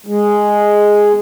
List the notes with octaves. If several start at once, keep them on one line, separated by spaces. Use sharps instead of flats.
G#3